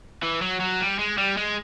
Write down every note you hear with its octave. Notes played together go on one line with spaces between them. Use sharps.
E3
F#3
F#3
G3
G#3
G3
G#3